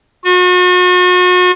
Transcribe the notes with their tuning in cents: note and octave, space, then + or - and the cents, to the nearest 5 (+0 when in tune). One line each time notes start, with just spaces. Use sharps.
F#4 -40